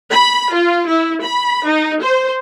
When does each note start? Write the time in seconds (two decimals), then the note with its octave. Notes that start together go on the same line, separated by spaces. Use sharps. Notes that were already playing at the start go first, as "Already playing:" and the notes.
0.12 B5
0.53 F4
0.89 E4
1.23 B5
1.67 D#4
2.03 C5